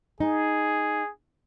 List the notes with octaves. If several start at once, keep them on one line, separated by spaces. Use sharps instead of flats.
D#4 G#4